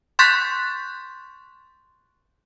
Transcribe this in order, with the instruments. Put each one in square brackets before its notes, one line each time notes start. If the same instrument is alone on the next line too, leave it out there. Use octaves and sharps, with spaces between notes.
[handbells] C6 C#6 F#6 G6 A6 B6